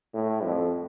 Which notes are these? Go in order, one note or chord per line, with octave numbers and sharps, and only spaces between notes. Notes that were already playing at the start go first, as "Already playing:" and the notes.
A2
F2